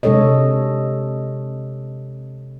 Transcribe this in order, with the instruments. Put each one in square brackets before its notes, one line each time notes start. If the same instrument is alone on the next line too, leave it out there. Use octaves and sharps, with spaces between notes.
[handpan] C3 G#3 D4 A4 C#5 D#5